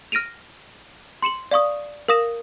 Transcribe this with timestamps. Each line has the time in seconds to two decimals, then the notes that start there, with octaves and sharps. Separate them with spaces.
0.12 F6 A#6 D7 D#7 F7
1.22 C6 C#7 E7 F#7
1.51 D5 F5 C#6 D#6
2.08 A#4 F5 D#6 A#6 E7